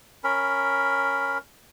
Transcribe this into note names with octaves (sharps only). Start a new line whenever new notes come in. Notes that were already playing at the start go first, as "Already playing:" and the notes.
C#4 A#4 B5